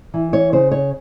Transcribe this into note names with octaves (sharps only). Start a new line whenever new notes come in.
E3
C#5
C#3 C5
C#5